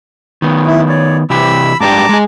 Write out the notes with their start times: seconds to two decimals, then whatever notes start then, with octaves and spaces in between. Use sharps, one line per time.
0.42 D#3 B3
0.67 E4
0.89 C#5 D5
1.30 C3 E3 G4 B5 E6
1.80 G#2 D4 G4 A5 A#5 D6
2.09 G#3 G#4